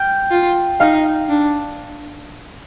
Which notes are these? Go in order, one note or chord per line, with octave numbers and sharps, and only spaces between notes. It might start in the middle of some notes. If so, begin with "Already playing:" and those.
Already playing: G5 F6 G6
F4
D#4 F5 F6
D4